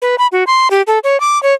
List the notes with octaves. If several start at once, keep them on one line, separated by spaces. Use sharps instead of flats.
B4
B5
F#4
C6
G4
A4
C#5
D6
C#5